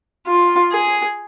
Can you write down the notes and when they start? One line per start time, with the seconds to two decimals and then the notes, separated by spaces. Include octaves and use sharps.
0.27 F4
0.72 G#4